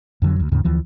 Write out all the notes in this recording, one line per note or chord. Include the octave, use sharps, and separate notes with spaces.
F2 D3 F#3
D2
D#2 G#2 C#3
D2 E3 F3